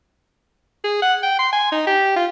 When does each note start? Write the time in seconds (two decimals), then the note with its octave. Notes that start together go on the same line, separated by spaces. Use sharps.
0.84 G#4
1.02 F#5
1.23 G5
1.39 C6
1.53 G#5
1.72 D#4
1.87 G4
2.16 F4